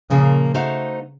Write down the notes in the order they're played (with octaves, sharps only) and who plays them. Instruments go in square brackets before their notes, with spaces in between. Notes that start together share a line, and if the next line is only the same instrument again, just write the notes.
[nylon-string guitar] A#2 F3 A#3 [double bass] C#3
[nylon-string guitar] A3 D#4 F#4 C5 F5